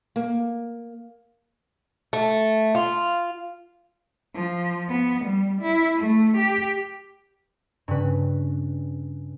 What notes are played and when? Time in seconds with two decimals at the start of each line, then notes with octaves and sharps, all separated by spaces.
0.16 A#3
2.13 A3
2.75 F4
4.35 F3
4.89 B3
5.26 G3
5.62 E4
5.97 A3
6.37 G4
7.88 G2 C#3 B4